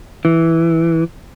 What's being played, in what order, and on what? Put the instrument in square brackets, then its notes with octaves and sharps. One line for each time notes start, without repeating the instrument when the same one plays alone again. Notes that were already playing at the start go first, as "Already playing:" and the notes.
[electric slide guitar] E3